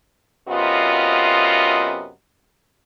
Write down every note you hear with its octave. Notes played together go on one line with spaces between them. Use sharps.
F#2 C3 B3 F4 D#5